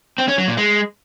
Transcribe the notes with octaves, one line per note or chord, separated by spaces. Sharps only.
C4
C#4
F#3
A#2
G#3